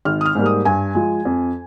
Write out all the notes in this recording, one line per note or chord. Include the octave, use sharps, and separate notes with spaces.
G#1 F6
D#6
F6
G#2 G3 A#3
D#6
G2 G#5
F3 G#3
F2